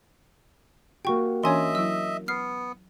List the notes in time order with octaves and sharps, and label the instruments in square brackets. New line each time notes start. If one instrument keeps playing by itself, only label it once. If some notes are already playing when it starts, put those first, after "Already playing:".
[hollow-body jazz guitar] A#3 F#4 G4 [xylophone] G5 C#6
[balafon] E3 C#4 D4 [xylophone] C#5 G#5 C6 [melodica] D#5 E5
[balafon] F#3 E4 [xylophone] E6
[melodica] B3 [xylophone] F6 C7